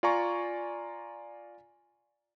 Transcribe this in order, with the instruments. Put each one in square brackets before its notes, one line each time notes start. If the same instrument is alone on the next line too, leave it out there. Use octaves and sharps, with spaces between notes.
[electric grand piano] F4 D5 G#5 A#5 C#6